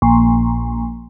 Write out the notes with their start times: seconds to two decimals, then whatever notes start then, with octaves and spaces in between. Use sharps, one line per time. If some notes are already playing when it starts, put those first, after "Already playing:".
0.02 A#1